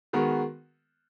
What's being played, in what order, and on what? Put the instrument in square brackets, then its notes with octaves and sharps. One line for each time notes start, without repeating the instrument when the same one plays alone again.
[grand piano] D#3 G#3 B3 F#4 A#4